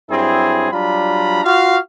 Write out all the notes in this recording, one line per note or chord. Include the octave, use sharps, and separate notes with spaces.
G2 F#3 C4 E4 G#4
F#3 G3 D4 F4 A#5 B5
F4 F#4 F5